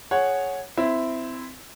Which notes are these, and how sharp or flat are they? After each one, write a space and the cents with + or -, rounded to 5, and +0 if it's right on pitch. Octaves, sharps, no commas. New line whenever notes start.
G#4 +0 C#5 +0 F#5 +0
C4 -15 E4 +0